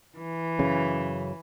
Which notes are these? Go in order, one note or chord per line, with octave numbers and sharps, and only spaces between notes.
E3
F#2 C#3